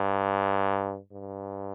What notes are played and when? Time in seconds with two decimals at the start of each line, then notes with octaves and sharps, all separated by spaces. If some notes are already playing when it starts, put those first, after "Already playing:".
Already playing: G2
1.12 G2